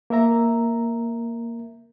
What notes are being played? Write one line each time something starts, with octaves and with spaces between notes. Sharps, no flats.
A#3 A#4 E5 A#5